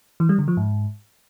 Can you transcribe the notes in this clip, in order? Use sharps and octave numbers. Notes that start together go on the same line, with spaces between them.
E3
G3
D3
F3
G#2